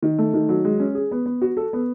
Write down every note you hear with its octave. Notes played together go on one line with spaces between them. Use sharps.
D#3
A3
D#3
F#3
G#3
C#4
G#4
B3
B3
F#4
A4
B3